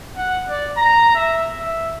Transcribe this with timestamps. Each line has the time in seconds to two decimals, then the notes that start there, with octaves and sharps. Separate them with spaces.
0.16 F#5
0.49 D5
0.77 A#5
1.15 E5
1.60 E5